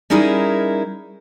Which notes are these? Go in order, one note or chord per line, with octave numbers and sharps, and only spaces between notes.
G3 C#4 D#4 E4 G#4 A#4